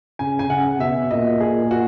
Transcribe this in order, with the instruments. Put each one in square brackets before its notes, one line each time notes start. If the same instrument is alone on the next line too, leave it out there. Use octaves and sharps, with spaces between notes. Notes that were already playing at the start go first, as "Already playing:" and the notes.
[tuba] C#3 [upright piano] G#5
[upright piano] G#5
[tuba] C#3 [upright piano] F#5
[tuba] B2 [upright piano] E5
[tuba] A#2 [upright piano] D#5
[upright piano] G#4
F#4